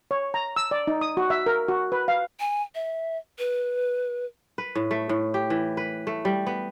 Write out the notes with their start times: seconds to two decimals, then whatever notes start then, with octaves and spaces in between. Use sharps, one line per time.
0.11 C#5
0.34 A#5
0.56 E6
0.71 D5
0.87 D#4
1.01 D#6
1.17 F#4
1.30 E5
1.46 A#4
1.68 F#4
1.92 B4
2.08 F5
2.40 G#5
2.75 E5
3.39 B4
4.58 B4
4.75 A2
4.91 A3
5.09 A2
5.34 G4
5.50 E3
5.77 B4
6.07 A3
6.25 G3
6.47 B3